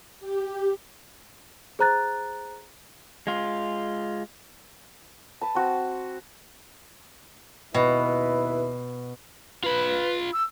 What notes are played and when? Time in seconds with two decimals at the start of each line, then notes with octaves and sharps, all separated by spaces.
0.20 G4
1.79 G#4 C5 A#5 F#6 A6
3.27 G#3 F4
5.41 B4 A5
5.55 C4 F#4
7.74 D#2 B2 E4 B4
9.64 F4 B4 B5
10.33 E6